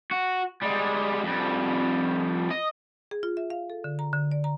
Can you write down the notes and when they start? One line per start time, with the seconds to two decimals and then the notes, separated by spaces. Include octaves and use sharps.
0.11 F#4
0.62 G3 G#3
1.23 F2 G3
2.51 D#5
3.11 G#4
3.23 F4
3.37 E5
3.50 F5
3.70 A4
3.84 D3
3.99 A#5
4.13 D3
4.32 D5
4.44 A#5